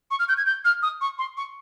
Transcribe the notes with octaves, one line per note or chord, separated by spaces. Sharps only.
C#6
F6
G6
G#6
G6
F6
D#6
C#6
C6
C#6